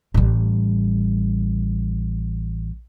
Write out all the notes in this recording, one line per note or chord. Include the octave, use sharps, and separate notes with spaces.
A1 G3